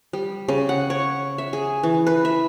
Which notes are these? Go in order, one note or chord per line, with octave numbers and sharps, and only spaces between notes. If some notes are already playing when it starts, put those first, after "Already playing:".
G3
C#3
F#5
C#5
E5
G#4
E3
B4
E5